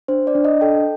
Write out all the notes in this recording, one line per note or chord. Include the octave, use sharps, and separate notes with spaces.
D4 C5
D5
D4
D#5
A4 G5